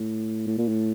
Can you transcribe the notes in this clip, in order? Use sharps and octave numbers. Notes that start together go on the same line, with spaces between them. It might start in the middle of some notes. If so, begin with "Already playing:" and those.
Already playing: A2
A2
A#2
A2